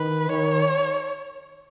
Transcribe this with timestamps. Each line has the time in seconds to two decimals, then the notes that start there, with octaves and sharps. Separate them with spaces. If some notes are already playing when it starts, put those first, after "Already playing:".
Already playing: D#3 B4
0.29 D#3 C#5